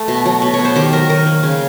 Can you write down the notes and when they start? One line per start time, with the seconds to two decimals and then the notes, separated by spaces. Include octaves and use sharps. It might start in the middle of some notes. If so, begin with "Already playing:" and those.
Already playing: A3
0.08 B2
0.26 F#3
0.42 B2
0.54 C#5
0.59 B3
0.65 C5
0.76 D#3 G4
0.93 F#3 A#4
1.10 D#3 A#4
1.26 A#3
1.43 C#3